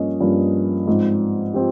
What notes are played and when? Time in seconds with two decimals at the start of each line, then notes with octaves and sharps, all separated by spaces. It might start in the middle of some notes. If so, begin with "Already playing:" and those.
Already playing: G2 F3 A#3 C#4 D#5
0.20 G2 F3 A#3 C#4
0.87 G#2 F3 C4
1.54 F3 C4 G4